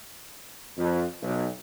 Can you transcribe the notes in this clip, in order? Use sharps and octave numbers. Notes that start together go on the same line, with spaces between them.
F2
B1